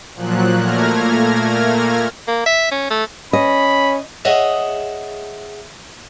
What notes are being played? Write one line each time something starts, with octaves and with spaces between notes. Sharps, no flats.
A#2 F3 F#3 F#6
A#2 A3 A#3 F6 G#6 A#6
A#3
E5
C#4
A3
C#4 D#5 B5
G#4 C#5 D#5 E5 F#5